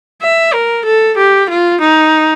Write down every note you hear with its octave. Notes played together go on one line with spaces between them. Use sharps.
E5
A#4
A4
G4
F4
D#4